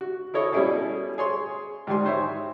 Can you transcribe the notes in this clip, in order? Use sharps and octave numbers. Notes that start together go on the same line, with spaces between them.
F#4
E4 A4 C#5 D#5
B2 G3 C#4 E4 G#4 A4
G#4 C#5 C6
G#2 D#3 G3 G#5 C6
D#4 C5 C#5 E5